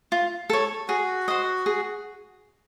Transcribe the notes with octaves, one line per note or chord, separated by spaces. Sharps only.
F4
A4 C#5
F#4 G#4
C5 D#5 F#5
G#4